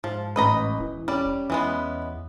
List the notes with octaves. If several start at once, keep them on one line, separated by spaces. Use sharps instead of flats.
G#2 F3
A1 B4 D#5 A#5 B5
E1 E3
G3 C#4 D5
E2 E3 G#3 B3